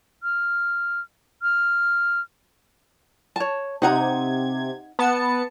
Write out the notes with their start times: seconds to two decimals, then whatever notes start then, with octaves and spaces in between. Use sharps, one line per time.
0.23 F6
1.42 F6
3.36 C#5 A5
3.82 C3 D#4 F#5 A#5 G#6
4.99 B3 A5 C#7